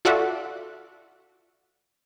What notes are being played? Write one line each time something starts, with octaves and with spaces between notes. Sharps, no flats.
F4 F#4 A4 D5 E5 F#5